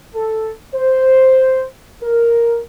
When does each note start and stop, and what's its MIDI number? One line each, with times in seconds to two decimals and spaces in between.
0.15 0.52 69
0.74 1.65 72
2.03 2.60 70